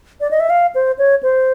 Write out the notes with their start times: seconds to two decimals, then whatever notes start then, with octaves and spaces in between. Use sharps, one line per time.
0.21 D5
0.31 D#5
0.40 E5
0.50 F5
0.75 C5
0.98 C#5
1.23 C5